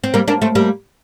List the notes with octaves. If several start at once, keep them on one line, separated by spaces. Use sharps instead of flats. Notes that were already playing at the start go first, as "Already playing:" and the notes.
C4
G3 A#3
A#3 D4
A3 C4
G3 A#3